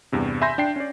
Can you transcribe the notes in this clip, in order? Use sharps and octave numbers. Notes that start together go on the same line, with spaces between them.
E2 G2 C3
E5 G#5 B5 C6 G6 A#6
D4 G5 C7
C#4 D5